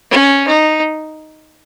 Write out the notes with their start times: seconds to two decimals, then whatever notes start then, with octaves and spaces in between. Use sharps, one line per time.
0.11 C#4
0.48 D#4